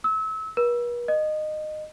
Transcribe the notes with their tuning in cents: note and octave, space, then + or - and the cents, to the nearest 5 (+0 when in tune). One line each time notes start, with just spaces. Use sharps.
E6 -30
B4 -45
D#5 -20